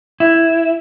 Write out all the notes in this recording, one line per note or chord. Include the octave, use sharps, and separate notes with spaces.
E4